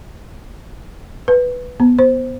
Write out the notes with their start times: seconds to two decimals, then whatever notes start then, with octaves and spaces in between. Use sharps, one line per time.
1.28 B4
1.80 B3
1.99 C5